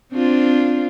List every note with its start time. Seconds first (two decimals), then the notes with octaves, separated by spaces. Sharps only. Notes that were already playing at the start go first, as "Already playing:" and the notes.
0.12 C4 D4 F4